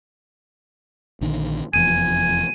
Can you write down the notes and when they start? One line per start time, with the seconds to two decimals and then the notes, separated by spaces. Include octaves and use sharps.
1.21 A#1 D3 D#3
1.73 F1 E2 F3 G#5 D#7